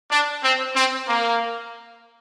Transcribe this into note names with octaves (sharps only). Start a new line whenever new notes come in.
D4
C4
C4
A#3